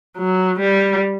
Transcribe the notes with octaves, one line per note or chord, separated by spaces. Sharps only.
F#3
G3